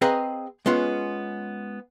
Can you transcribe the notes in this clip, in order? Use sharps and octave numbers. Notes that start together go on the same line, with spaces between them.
C4 G#4 B4 D#5 F5 A#5
G#3 B3 C#4 F4